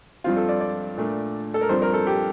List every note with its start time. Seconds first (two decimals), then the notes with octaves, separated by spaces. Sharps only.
0.24 G2 F3 C4 F4
0.37 A4
0.49 D5
0.61 D5
0.97 A#2 A3 D4
1.54 A4
1.61 A#4
1.69 G2 F3 C4 C5
1.82 A#4
1.93 A4
2.07 G4